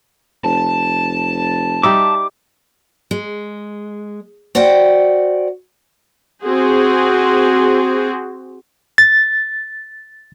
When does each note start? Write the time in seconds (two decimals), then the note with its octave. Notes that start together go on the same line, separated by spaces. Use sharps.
0.44 F1 A5
1.83 G3 D#4 E5 D6
3.11 G#3
4.55 F#4 C5 D5 F#5 G5
6.43 C4 F#4 G#4 C5
8.98 A6